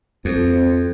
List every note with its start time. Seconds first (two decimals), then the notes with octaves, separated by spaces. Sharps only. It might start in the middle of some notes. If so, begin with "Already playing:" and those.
0.25 F2 C4